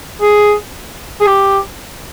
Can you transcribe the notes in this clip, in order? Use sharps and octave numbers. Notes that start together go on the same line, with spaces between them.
G#4
G#4
G4